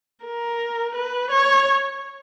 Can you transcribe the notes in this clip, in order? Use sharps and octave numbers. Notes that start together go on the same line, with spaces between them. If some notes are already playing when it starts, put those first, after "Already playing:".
A#4
B4
C#5